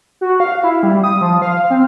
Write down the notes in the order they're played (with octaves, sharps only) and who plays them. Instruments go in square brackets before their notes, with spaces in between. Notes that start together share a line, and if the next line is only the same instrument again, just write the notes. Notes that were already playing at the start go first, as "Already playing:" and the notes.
[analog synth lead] F#4
F5
E4
G3
D#6
F3
F5
C4